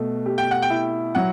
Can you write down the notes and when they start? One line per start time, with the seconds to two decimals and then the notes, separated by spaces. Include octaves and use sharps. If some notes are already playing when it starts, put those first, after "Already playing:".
Already playing: B2 A3
0.26 G4
0.38 G5
0.51 F#5
0.62 G5
0.70 E4
1.15 F#3 F#5